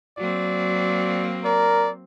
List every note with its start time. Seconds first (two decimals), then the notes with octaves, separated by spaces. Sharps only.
0.18 F#3 A#3 C4 D5
1.45 A#4 D5